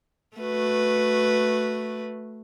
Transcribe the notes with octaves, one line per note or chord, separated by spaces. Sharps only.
A3 F#4 B4